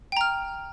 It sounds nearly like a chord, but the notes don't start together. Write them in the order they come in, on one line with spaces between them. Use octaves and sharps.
G5 A#5 F6